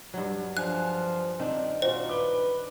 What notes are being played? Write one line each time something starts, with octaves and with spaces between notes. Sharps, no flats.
G2 F#3
F3 D4 G#5 F#6
D#3 C4 D4
A#2 D#4 F4 F#4 C5
B4 D6 G7